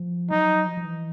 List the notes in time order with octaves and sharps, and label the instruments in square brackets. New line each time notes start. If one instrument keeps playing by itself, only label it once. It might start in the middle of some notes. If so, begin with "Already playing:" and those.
Already playing: [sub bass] F3
[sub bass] F#3 [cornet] D#4
[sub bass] F3
F3
E3